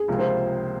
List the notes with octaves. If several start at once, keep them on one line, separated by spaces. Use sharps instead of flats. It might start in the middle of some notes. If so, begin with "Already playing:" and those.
Already playing: G#4
C#2 C3 F3 A#3
C5